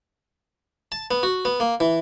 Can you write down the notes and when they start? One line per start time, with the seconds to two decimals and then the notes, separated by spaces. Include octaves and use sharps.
0.92 A5
1.11 B3
1.23 F#4
1.45 B3
1.60 A#3
1.80 E3